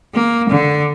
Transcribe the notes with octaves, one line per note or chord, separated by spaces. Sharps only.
A#3
D3